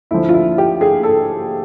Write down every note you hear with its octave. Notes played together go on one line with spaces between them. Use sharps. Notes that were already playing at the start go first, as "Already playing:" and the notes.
D2 D3 F3 E4
F4
E4
G4
G#4
A4